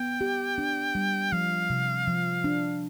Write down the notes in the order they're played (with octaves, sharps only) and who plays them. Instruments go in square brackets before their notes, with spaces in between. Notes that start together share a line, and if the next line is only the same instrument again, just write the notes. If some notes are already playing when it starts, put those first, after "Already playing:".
Already playing: [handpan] B3 [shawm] G5
[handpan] G4
D4
G3
[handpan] F3 [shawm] F5
[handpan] C3
F3
D4